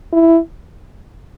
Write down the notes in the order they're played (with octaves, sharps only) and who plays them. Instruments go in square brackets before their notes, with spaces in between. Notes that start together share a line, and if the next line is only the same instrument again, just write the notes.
[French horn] E4